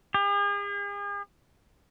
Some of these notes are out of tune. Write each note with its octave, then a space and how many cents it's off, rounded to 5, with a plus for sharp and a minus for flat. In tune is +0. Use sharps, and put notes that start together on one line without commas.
G#4 -45